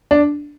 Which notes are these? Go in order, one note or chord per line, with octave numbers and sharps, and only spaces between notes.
D4